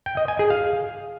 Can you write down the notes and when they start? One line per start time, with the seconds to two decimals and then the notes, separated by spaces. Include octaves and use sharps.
0.06 G5
0.17 D#5
0.28 G#5
0.39 G#4
0.50 F5